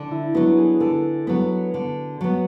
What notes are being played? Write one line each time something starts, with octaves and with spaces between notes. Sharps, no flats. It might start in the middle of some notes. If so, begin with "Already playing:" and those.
Already playing: D3 D4
E4
F#3 B3 F#4
G#4
D3 A4
F#3 B3
D3
F#3 B3